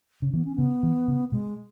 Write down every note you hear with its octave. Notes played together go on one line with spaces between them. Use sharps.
C#3
E3 B3
C#4
C#3 B3
E3
C#3
B2 G#3